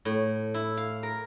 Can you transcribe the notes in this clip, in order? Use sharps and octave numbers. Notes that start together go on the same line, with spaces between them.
A2
E4
F5
A#4